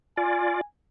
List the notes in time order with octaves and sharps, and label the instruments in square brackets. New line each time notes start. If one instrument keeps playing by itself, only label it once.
[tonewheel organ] F4 D5 [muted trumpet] G#5